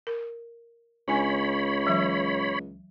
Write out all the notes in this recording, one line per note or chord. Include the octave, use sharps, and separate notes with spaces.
A#4
C#2 D4 C#5 G#5 B5
E3 F#3 E5